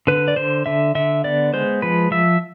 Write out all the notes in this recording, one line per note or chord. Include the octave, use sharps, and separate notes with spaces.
D3 B4
D5
D3 C5
D3 E5
D3 E5
B3 D5
G#3 C5
F3 B4
F3 E5